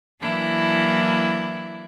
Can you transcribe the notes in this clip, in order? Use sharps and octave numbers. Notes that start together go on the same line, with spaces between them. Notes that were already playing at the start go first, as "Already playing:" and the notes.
E3 F#3 A#3 D4 E4